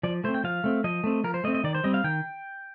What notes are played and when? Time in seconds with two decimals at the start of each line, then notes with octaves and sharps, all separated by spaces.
0.03 F3 D5
0.24 A3 C4 C5
0.34 G5
0.44 F3 F5
0.64 A3 C4
0.84 F3 D#5
1.04 A3 C4
1.24 F3 A#4
1.34 C5
1.44 A3 D#5
1.47 C4
1.55 D#5
1.64 D#3 D5
1.75 C5
1.84 G3 C4 D#5
1.94 F5
2.04 D#3 G5